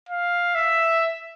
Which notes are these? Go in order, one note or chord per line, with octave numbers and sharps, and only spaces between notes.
F5
E5